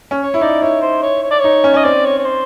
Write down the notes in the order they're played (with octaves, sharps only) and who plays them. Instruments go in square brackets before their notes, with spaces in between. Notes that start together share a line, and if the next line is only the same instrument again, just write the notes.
[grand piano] C#4
[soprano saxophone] C#5
[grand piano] E4
[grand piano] D#4 [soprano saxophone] D5
[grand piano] E4 [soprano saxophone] C#5
[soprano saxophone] C5
C#5
C#5
D5
[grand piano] D#4 [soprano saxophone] C#5
[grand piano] C#4
[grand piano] C#4 [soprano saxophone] D#5
[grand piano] C4 [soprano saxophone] D5
[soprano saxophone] C#5
C#5
C5